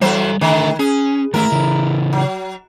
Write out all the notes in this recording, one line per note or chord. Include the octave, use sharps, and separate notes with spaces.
E3 F#3 G3 A4 C5
D3 D#3 A3 A#5
C#4 G#4
D#3 E3 A3 E4 A#4
C#3 E3
F#3